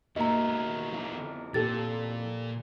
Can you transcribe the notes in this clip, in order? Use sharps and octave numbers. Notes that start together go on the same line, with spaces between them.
A#2 D#3 A#3 B3 F#4 D#5 E5 A#5
F2 E4
A#2 G4 A4 A6